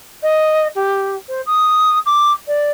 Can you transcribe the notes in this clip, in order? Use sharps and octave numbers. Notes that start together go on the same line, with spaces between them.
D#5
G4
C5
D#6
D6
D5